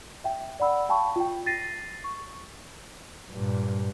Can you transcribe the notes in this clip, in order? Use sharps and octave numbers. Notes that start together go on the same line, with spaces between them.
E5 G5
D5 F#5 B5 E6
F5 G5 A5 B5 C#6
F4 G5
A6 A#6 C7 D#7
C#6
G2 A#2